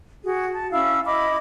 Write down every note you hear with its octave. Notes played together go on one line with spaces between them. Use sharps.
F#4 G#4
A5
C#4 E4 F5 E6
E4 D#5 B5 D6